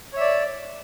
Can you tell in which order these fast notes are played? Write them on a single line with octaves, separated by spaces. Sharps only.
C#5 E5 D5